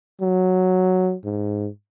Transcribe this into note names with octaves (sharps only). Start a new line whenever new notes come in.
F#3
G#2